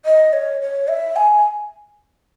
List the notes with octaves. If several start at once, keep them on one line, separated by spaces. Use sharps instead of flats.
D#5
C#5
C#5
E5
G#5